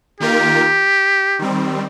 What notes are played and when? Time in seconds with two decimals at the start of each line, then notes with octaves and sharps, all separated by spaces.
0.20 D#3 A#3 F4 G4 A#4
1.39 D#3 G3 C4